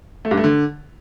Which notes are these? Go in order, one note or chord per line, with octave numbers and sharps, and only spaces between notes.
A3
G2
A3
D3